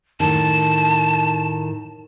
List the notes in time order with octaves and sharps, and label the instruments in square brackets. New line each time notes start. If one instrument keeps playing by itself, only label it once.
[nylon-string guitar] A2 D#3 [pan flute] A5